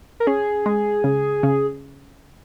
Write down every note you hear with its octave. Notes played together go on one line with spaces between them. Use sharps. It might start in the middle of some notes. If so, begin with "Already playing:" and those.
A#4
C#4 G#4
G#3
C#3
C#3